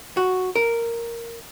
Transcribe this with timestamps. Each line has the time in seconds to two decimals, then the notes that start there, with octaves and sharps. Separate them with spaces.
0.17 F#4
0.56 A#4